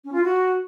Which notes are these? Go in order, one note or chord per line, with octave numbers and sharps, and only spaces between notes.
C#4
F4
F#4